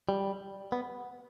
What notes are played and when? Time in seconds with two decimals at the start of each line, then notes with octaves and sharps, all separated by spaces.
0.09 G3
0.72 B3